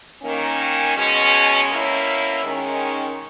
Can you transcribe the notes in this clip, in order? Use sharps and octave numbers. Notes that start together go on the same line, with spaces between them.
D#3 A#3 C#4
B2 G#3 C#4
B2 A#3 C#4 E4
D#3 G#3 C#4